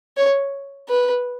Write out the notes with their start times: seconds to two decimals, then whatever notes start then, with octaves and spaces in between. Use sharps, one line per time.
0.17 C#5
0.89 B4